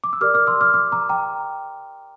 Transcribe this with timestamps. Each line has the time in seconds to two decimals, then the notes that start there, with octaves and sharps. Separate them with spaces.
0.04 D6
0.13 E6
0.21 G4 A#4 D5 D6 F6
0.34 D6 F6
0.47 C6 E6
0.61 D6 F6
0.74 D6 F6
0.92 A#5 D6
1.09 G5 A#5